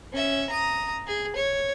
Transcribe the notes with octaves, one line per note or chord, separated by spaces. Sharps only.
C#4 E5
A#5 D#6
G#4
C#5